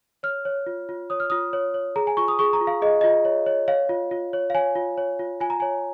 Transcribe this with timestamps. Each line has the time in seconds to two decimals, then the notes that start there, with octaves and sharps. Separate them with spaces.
0.23 C#5 F6
0.45 C#5
0.67 F4
0.89 F4
1.10 C#5 D#6
1.20 F6
1.30 F4 D#6
1.53 C#5
1.74 C#5
1.96 G#4 A#5
2.07 G#5
2.17 F4 C#6
2.28 D#6
2.39 G#4 C#6
2.53 A#5
2.61 F4
2.67 F5
2.82 G#4 D#5
3.01 F4 D#5
3.25 C#5
3.46 C#5
3.68 C#5 F5
3.89 F4
4.11 F4
4.33 C#5
4.50 F5
4.55 C#5 G#5
4.75 F4
4.97 C#5
5.19 F4
5.40 F4 G#5
5.50 A#5
5.60 C#5 G#5